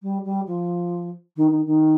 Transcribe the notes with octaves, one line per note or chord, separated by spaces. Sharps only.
G3
G3
F3
D#3
D#3
D#3